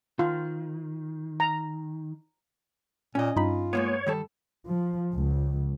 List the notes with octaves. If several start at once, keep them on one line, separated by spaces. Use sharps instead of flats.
D#3 F4
A#5
A#2 C#4 D#5
G2 D#4 F4 B5
G#3 A#3 B3 C#5
D#3 G3 A4
F3
C#2